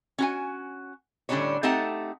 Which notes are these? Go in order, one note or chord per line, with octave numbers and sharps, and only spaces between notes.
C#4 F#4 G#5
A2 D3 G3 C#4 D4 C#5
A3 C4 D#4 G4 F#5 A5